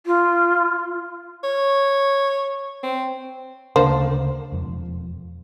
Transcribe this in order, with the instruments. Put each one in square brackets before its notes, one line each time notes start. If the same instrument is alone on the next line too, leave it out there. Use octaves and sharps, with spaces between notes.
[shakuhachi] F4
[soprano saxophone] C#5
C4
[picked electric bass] D2 C#3 [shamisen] A#3 D4 C5
[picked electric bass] E1 F2